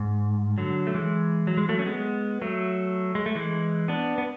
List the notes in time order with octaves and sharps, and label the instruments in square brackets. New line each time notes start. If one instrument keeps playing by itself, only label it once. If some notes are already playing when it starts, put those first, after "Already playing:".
Already playing: [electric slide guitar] G#2
D3 F#3
A3
E3 G#3
F#3
G#3
F#3 A3
C#4
G#3 B3
F#3 A3
G#3
A3
E3 G#3
B3 D4
B3